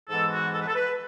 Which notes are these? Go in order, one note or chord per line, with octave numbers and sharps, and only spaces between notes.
G#2 E3 G#3 B3 A4
F#4
A4
B4
A4
B4